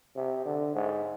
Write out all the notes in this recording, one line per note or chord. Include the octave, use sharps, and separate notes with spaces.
C3
D3
G#2